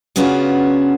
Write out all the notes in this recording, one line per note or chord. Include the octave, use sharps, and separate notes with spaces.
C#3 B3 C#4 D4 F4 F#4